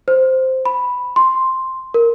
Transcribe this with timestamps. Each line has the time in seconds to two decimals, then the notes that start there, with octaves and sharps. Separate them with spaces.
0.08 C5
0.65 B5
1.16 C6
1.94 A#4